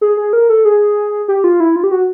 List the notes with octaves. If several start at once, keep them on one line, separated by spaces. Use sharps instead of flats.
G#4
G#4
A#4
A4
G#4
G4
F4
E4
F4
G4
F#4